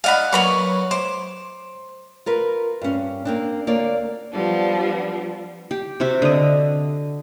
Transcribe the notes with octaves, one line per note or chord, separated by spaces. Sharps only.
D#4 D5 F5 F#5 G#5 B5
F#3 A#3 B3 C#5 B5 C#6
C5 D6
F4 A#4 B4
G2 C#4
A#3 C4 D4
D2 A#3 C#5 D5
F3 G3 B3 D4
G4
C3 F#4 E5
D3 D#5